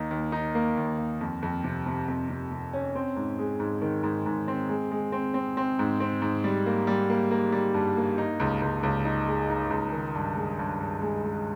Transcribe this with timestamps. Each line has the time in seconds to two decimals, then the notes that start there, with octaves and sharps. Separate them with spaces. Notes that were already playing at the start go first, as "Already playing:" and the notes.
Already playing: D#2 A#3 D#4
0.11 D#2
0.32 D#4
0.55 A#3
0.77 D#2
0.98 D#2
1.21 F2
1.42 F2
1.64 C3
1.86 C3
2.08 F2
2.29 C3
2.52 C3
2.73 C#4
2.95 C4
3.16 G#2
3.39 G#3
3.60 G#2
3.82 D#3
4.03 G#2
4.26 G#2
4.48 C4
4.69 G#3
4.91 G#3
5.12 C4
5.34 C4
5.57 C4
5.79 G#2
6.00 C4
6.22 G#2
6.44 G3
6.66 A#3
6.87 G3
7.10 A#3
7.31 A#3
7.52 G3
7.74 G2
7.97 A#3
8.18 D#4
8.40 C#2
8.62 C#2
8.83 C#2
9.05 D#4
9.28 G#3
9.50 D#4
9.70 C#2
9.92 D#3
10.14 G2
10.36 G#3
10.59 G2
10.80 G2
11.02 G#3
11.24 G#3